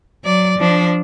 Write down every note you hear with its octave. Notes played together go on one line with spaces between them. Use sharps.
F#3 D5
F3 D4